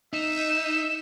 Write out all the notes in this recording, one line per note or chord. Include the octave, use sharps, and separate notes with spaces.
D#4 E5 E7